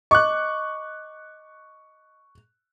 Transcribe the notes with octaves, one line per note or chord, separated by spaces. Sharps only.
D#5 C#6 D6 F#6